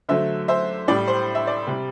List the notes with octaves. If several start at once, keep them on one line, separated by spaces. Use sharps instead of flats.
D3 F#3 A3 C5 E5
C5 E5
A2 G3 D5
C5
E5
D5
C3 G3